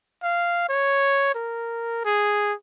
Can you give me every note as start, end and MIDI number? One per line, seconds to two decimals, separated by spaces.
0.23 0.65 77
0.69 1.31 73
1.35 2.00 70
2.05 2.53 68